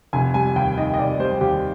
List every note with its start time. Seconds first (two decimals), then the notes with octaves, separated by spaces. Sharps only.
0.13 F1 G#5
0.34 G3 G#5
0.56 D#2 G5
0.77 D#3 D#5
0.94 D#5
0.98 F1 D5
1.19 G3 C5
1.41 D#2 G4